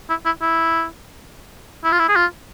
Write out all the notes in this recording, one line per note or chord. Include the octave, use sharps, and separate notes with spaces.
E4
E4
E4
E4
F4
E4
G#4
F4